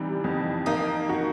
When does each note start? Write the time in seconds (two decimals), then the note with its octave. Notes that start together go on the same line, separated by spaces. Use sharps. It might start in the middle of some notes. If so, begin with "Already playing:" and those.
Already playing: C3 E3 G3 D#4
0.24 F2
0.66 A#3 D#4
1.09 F#4